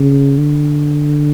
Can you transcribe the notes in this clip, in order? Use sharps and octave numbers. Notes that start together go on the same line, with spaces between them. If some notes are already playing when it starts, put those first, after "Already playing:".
Already playing: C#3
D3